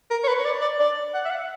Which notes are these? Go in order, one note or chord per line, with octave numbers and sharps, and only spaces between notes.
A#4
C#5
B4
C#5
D5
D5
D5
F#5
E5
F#5